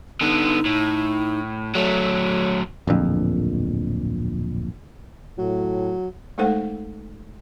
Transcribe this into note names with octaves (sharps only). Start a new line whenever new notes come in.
D3 B3 D#4
A2
F#3 A3 C#5
D1 A#1 F2
A2 F#3
G#3 A3 D#4 A4 C5 F#5